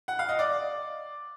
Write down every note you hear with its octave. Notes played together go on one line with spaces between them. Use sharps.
F#5
F5
D#5
D5